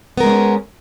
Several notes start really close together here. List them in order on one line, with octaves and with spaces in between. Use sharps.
B3 A#4 G#3 D4 C#4